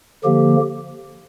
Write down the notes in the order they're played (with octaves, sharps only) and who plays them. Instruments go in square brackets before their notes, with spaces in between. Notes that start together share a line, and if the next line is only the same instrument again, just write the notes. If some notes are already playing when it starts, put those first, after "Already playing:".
[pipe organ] D3 F3 A#3 G4